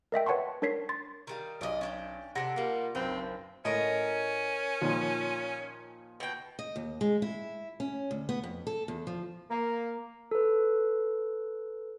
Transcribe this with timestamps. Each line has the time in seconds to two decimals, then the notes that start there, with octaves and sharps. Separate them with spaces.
0.12 A#4 D#5 E5 G5
0.26 B4 C#5 F#5 A5 C6 C#6
0.62 D4 A#4 C#5 B6 C7
0.89 C6 A6
1.27 D#3 G3 F5
1.61 B1 D5 D#5
1.81 C#4 D4 G5
2.35 C3 D4 A4 F#5 A#6
2.56 G3 A#3 F4
2.95 F#1 B1 C4 B4
3.65 A2 C#4 A#4 D#5
4.81 A#2 D#3 F3
6.20 B2 G5
6.59 D#5
6.76 D#2
7.01 G#3
7.22 E4
7.80 C#4
8.11 D2
8.29 B3
8.44 F2
8.67 A4
8.88 E2
9.07 F3
9.51 A#3
10.31 A4 B4